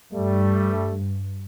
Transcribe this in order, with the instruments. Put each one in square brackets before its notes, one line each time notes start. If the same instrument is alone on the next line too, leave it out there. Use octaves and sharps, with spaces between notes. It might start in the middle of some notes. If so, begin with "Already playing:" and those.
[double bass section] G2 [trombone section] G3 A3